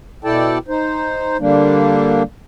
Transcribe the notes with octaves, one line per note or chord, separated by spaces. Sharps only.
B2 E4 A4 D5 G5 A5
D#4 C5
D3 G3 A#3 D4